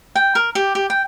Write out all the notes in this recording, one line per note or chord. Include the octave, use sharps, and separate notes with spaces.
G5
A#4
G4
G4
G5